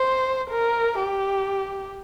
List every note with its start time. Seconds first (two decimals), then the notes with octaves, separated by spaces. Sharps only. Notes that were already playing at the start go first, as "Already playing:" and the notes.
Already playing: C5
0.51 A#4
1.00 G4